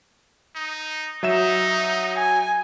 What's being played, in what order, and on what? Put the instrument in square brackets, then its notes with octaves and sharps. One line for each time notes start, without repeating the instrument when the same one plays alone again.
[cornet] D#4
[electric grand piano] F#3 E5 E7 [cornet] D#4
[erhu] G#5